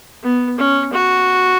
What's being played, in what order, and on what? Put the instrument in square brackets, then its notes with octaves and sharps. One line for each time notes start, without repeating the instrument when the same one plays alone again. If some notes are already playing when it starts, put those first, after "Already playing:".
[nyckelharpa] B3
C#4
F#4